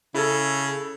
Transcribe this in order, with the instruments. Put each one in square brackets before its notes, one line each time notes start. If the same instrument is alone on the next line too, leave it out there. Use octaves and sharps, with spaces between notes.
[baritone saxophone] C#3 [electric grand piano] E4 A4